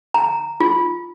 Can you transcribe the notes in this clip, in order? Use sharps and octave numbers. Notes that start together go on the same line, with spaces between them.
A#5
F4